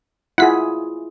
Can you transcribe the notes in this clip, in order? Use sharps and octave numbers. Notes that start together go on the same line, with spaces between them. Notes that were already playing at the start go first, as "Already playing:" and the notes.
E4 F4 G#4 F#5 B6